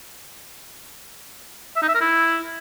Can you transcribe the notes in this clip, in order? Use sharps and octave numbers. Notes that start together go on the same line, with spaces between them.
E5
D#4
E5
A#4
E4